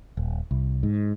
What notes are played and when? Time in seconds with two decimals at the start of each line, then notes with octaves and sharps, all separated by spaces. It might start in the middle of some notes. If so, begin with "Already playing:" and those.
0.17 D#1
0.51 C2
0.83 G#2